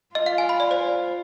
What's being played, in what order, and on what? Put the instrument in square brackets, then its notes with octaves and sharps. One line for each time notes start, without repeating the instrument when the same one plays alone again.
[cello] F4 [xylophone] D#5
[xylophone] F5
G#5
B5
D5
C5